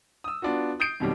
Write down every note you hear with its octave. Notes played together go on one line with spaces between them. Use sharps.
D#6 E6
B3 D4 F4 F#4
D#6 G6 C7 D7
F2 B2 D#3 F#3 G3